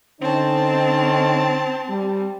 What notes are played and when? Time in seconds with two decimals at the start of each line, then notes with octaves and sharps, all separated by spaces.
0.21 D3 C4 C#4 D#4 C5 A5
1.89 G3